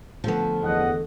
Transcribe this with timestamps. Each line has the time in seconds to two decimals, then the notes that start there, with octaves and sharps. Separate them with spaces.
0.24 D3 F3 A3 B3
0.63 E2 D#5 F#5